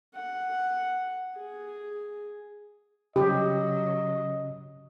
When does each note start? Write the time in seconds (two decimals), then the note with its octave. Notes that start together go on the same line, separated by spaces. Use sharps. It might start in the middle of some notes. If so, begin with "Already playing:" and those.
0.15 F#5
1.38 G#4
3.16 C#3 F#3 C#4 G4 D#5